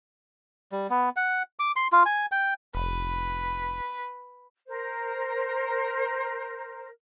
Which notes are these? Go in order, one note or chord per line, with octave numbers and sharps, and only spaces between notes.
G3
B3
F#5
D6
C6
F4
G#5
G5
F1 B4
A#4 C5